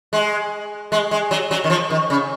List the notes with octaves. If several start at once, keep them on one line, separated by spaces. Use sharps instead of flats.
G#3
G#3
G#3
F#3
F#3
D#3
F3
D#3
C#3